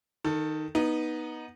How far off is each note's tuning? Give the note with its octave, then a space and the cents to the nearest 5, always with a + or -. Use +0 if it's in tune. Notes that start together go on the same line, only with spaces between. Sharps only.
D#3 +0 A4 +20
B3 -15 D#4 +0